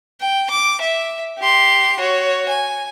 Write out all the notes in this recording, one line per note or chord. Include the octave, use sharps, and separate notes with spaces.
G5
D6
E5
G4 C6
F#4 C#5
G#5